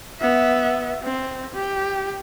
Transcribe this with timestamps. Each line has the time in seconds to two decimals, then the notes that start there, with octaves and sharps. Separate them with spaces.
0.20 B3 E5
1.03 C4
1.55 G4